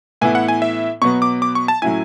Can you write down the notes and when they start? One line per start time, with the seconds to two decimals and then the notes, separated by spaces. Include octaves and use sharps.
0.21 A2 E3 B3 E4 G#5
0.35 F#5
0.48 G#5
0.62 E5
1.02 B2 F#3 B3 C#6
1.22 D6
1.42 D6
1.55 C#6
1.68 A5
1.82 A2 F#3 C#4 E4 G#5